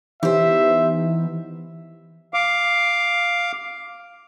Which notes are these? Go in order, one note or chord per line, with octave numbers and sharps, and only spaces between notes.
E3 B3 D#4 G4 C5 E5
F5 D6